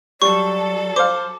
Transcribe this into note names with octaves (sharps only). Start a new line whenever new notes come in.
F#3 G3 A4 D5 C#6
C5 F5 D6